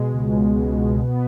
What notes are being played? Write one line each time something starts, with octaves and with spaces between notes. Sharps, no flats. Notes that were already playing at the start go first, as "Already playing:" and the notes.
Already playing: B2 G#3
C#2
B2
B3